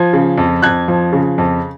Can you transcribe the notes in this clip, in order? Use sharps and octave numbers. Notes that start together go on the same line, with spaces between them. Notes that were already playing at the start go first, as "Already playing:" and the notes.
Already playing: F3 G#6
C#3
F2
F2 F#6 G#6
F3
C#3
F2